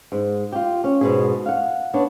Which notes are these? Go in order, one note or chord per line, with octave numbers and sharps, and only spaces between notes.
G#2
F4 G4
C#4
G#2 B2 G#4
F5 F#5
B3 D4 C#5